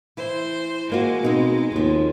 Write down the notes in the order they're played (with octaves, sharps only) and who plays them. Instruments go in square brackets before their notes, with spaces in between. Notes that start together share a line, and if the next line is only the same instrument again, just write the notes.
[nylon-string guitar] E3 E4 [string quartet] C5
[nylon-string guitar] E3 A#3 F#4 [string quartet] G#3
[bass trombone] B2 [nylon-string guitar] C4 D#4 B4
[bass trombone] D#2 [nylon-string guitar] D#3 F3